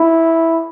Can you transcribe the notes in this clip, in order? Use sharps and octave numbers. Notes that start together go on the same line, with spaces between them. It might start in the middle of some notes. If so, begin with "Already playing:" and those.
Already playing: E4